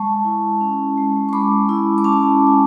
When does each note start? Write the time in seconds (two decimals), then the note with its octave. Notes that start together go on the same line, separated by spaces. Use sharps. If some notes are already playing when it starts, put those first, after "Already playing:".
Already playing: G#3 A5 C#6
0.25 E4
0.61 C#4
0.97 G#3
1.29 C#6
1.33 G#3 B5 D6
1.69 E4
1.98 D6
2.04 C#4 A5 C#6
2.41 G#3
2.47 G#5